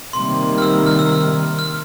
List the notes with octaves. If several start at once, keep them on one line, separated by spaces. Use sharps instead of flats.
C3 D#3 G3 A#3 C6
F6
E6
F6
E6
F6
F6